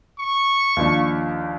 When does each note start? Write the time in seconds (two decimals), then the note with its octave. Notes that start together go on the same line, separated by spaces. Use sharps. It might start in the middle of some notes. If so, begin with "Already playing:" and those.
0.19 C#6
0.77 D#2 F3 D4